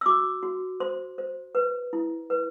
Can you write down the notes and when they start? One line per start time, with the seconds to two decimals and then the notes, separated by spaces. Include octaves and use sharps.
0.01 E6
0.06 F#4 D6
0.43 F#4
0.80 C5 C6
1.18 C5
1.55 B4
1.93 E4
2.30 B4